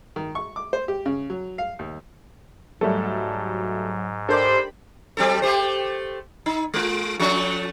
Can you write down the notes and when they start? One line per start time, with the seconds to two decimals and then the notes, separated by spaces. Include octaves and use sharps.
0.16 D#3
0.35 C#6
0.56 D6
0.73 C5
0.88 G4
1.06 C#3
1.30 F#3
1.58 F5
1.79 D#2
2.81 G#2 F#3 G3 A3 A4
4.29 D4 G4 A4 A#4 C5 D5 B5
5.17 F#3 C4 A4
5.42 A3 G4 C5
6.46 D#4
6.74 G#3 F4
7.19 F3 A3 C#4